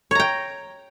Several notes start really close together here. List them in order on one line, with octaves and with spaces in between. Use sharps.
C#5 A#5 G5